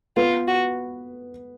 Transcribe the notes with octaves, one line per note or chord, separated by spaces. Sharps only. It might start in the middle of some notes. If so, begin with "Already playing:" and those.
B3 F4 B4
F#4